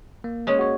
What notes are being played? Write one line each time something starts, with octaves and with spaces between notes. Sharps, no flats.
A#3
G#3 C#4
F#4 C#5